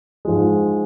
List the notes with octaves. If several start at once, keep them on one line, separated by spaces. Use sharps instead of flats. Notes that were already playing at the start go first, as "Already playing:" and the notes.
G#2 F3 G#3